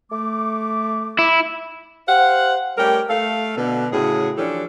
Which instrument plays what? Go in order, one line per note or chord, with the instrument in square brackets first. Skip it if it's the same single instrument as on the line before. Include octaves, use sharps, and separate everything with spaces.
[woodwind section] A3 D6
[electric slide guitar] E4
[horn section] G4 C5 F5 F#5
G3 A3 C#4 G4 A#4 G5
A3 A4 F5
B2 D3
A2 C#3 C#4 F#4 G#4
E3 F3 C#4 D4 G4 A4